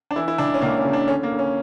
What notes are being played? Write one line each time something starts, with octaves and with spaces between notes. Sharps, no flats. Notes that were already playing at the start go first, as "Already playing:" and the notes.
D4
E3 E4
E4
C#2 D4
C#4
C#2 A#3
C#4
C#3
D4
D3 C#4
A#3
D2
C#4